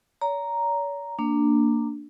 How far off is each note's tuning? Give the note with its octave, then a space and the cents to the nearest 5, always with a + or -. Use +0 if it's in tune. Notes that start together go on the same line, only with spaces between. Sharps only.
C#5 +45 A#5 +0
A#3 -15 D4 +0